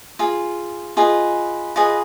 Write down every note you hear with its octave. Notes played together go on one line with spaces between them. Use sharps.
F4 G#4
F4 G#4 B4 D#5
F4 G#4 B4 D#5